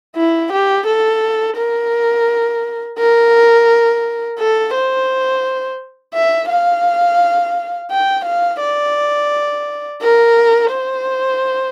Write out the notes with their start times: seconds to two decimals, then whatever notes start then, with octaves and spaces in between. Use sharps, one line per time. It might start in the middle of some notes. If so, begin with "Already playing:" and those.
0.16 E4
0.52 G4
0.86 A4
1.57 A#4
2.98 A#4
4.39 A4
4.74 C5
6.14 E5
6.49 F5
7.91 G5
8.25 F5
8.60 D5
10.02 A#4
10.71 C5